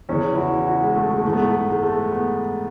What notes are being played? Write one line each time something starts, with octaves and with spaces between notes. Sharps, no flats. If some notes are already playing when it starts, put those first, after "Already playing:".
E2 C#3 E3 C#4
E4
F#4
F#4
G#3
A3
A3
G#2 E3 A3
B3
A3
A3
G#3
A3
B3